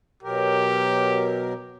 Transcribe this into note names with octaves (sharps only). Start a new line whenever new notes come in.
B2 F#3 G4 A#4